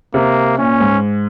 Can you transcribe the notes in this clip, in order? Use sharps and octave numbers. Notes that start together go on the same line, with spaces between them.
C3 A#3
A#2 C#4
G#2